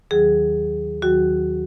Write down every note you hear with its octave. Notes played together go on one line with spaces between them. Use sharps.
D#2 D#3 F#3 G#4
D#2 D#3 F#3 F#4